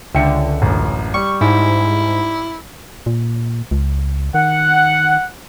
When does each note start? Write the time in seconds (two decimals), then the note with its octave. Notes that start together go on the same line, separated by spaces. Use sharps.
0.15 C#2 D3 E5 G5 C#7
0.62 A1 F#2
1.14 G3 C#6
1.41 G#2 E4
3.06 A#2
3.71 C#2
4.34 D#3 F#5